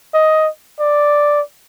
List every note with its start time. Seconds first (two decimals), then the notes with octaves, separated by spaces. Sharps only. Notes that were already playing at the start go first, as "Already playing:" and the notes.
0.14 D#5
0.80 D5